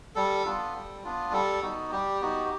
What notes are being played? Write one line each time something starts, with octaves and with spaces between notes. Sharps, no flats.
G3 A4
B3 D4 F4
G3
B3 D4 F4
G3 A4
B3 D#4 F#4
G3 G4
B3 D#4 F#4